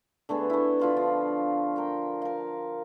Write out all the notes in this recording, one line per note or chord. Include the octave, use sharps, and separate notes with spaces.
D3 A3 B3 G#4
A3 E4
D3 F4 B5
F3
A#4 G5 A#5
A#4 F5